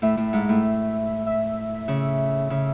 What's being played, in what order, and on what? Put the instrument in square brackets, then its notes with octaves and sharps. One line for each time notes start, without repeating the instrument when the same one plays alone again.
[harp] A2 [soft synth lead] E5
[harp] A2
G#2
A2
[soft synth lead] E5
[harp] C#3
C#3